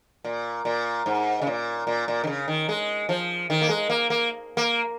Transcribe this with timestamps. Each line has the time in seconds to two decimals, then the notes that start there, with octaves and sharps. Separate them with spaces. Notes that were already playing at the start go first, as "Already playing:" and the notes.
0.24 A#2
0.65 A#2
1.06 G#2
1.42 C#3
1.47 A#2
1.87 A#2
2.08 A#2
2.24 D#3
2.27 C#3
2.48 D#3
2.69 G#3
3.09 F3
3.50 D#3
3.62 A#3
3.69 G#3
3.90 A#3
4.10 A#3
4.57 A#3